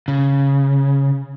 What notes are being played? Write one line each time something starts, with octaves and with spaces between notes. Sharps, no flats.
C#3